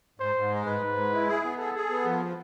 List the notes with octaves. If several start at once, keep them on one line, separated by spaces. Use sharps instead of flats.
G#2 C5
G#2
G#3
G#2 B4
G#2
G#3
E4
G#4
B3
G#4 A4
G#4
B3
F3